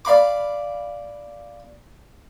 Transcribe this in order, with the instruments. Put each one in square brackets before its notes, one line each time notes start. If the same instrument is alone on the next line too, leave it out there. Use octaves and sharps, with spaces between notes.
[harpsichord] D5 F5 B5 D6